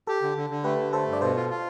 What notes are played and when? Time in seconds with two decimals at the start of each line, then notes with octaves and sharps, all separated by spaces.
0.07 G4 A4
0.22 D3
0.36 D3
0.50 D3
0.64 A3 G4 B4
0.79 D3
0.93 A3 A4 C5
1.07 G2
1.13 D5
1.21 B2 A4 C5
1.36 F4
1.50 F4